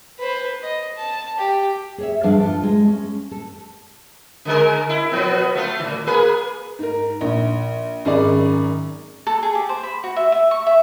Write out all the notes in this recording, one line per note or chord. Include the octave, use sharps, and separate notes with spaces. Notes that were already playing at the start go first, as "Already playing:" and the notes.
B4 C5
D#5
A5
G4
G#4 C#5 E5
G2 F3 D4 G#4 E5 F5
F4 A4
G#3
C#4
A4
D3 G#3 A#4
E4
B2 F3 B3
A3 F4
A2 D#3
A#3 G#4 B4
G#2 A#4
A#1
G#1 F#2 C#4 G#4 D5
A4
G#4
G4
C5
B5
F#4
E5
E5
C#6
E5